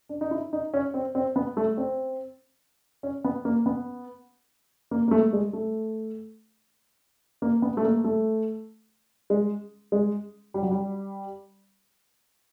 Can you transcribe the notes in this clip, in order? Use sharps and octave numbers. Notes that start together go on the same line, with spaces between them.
D4
D#4
E4
D#4
C#4
C4
C4
B3
A3
C4
C#4
B3
A#3
B3
A#3
A#3
A3
G#3
A3
A#3
B3
A3
A#3
A3
G#3
G#3
G3
F#3
G3